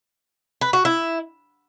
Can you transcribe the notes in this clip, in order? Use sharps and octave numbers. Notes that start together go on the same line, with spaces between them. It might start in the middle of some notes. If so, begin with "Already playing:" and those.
B4
F#4
E4